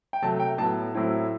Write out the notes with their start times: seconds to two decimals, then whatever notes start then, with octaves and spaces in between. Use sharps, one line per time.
0.13 G5
0.22 C3 F#3 A3 A5
0.40 G5
0.58 A2 F#3 B3 A5
0.94 A2 F#3 C4 E4